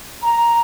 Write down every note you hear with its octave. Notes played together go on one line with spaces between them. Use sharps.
A#5